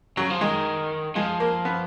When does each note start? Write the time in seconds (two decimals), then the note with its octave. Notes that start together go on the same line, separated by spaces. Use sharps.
0.17 C#3 F#3
0.30 F3
0.41 D#3 G#3
1.15 F3 G#3
1.40 A#3
1.65 B3